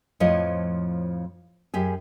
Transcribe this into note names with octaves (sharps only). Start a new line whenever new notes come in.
F2 A2 F3 C#5 D#5
F#2 G4 G#4